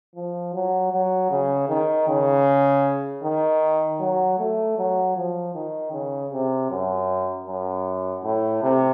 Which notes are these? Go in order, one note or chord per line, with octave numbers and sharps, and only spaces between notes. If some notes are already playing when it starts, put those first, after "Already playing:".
F3
F#3
F#3
C#3
D#3
C#3
D#3
F#3
A3
F#3
F3
D#3
C#3
C3
F#2
F#2
A2
C3